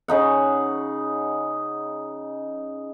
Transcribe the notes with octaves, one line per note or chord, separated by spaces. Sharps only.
C#3 D#4 F#5